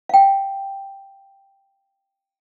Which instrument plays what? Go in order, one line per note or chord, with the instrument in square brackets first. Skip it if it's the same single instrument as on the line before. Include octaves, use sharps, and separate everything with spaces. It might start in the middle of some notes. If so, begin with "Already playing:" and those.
[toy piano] F5 G5